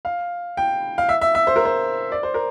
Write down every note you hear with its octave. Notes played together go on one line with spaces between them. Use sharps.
F5
G5
F5
E5
E5
E5
C5
A#4
C5
D5
C5
A#4